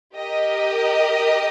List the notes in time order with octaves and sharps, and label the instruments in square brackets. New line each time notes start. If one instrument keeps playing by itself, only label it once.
[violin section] G4 A#4 D#5